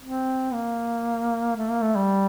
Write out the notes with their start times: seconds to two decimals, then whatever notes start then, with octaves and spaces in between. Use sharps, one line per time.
0.02 C4
0.53 A#3
1.57 A3
1.70 A#3
1.82 A3
1.96 G3